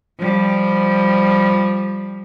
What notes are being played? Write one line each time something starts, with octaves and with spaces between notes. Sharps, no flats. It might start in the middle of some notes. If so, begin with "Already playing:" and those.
F3 G3